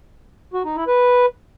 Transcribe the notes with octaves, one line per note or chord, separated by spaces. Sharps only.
F#4
D#4
E4
B4